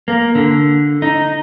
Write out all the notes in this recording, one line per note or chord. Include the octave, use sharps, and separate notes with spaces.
A#3
D3
D#4